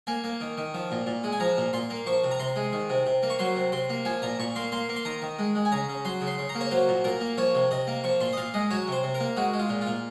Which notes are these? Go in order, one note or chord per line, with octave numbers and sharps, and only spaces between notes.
A#3 G#5
A#3
D#3
D#3
F3
A#2
A#2
G#3
G#5
F3 A#5
A#2
A#2 C6
A#3
F3 C#6
C3
A#5
C3 C6
G#3
D#3
C3
C3
A#3
C#6
F#3 C6
C3
C3 C6
A#3
F3 G#5
A#2 A#5
A#2 C#6
A#3 C6
A#3 C6
A#3
C6
D#3 A#5
D#3
G#3
G#3
G#5
C#3 A#5
C#3
F#3 C6
C#3
C6
C#3
A#5
A#3
C#5
F#3 C5
A#2
A#2 A#4
A#3
F3 C#5
C3
C3 D#5
A#3
F3 C#6
A#2 C6
D#5
A#2 F5
G#3 D#5
F#3 C#5
C3 C5
C3
A#4
A#3
G#3 F#4
G#3
F4
A#2
F4
A#2